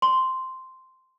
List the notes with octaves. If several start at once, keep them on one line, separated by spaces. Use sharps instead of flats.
C6